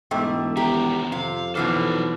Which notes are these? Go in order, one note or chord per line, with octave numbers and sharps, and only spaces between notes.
E1 G#2 A3 G5 D6
D#3 B3 G4 E5 A#5 B6
F2 C3 F5
B2 E3 F#3 D#4 A4 D6 F6 C7